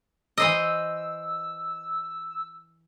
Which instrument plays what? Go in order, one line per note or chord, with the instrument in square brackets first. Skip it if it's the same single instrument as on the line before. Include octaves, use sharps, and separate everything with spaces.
[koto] E3 C5 D#5 [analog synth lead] E6